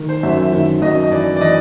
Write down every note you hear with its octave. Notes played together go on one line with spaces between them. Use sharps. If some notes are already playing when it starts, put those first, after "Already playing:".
Already playing: D#3
C5
F#2 E5
E5
D#3 E5
F#2 D#5
D#5
E3 D5
D5
E3 D#5